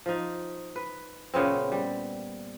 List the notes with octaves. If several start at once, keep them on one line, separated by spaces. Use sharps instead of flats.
F3 D#4
B4
A#2 C#3 B3 C4
G3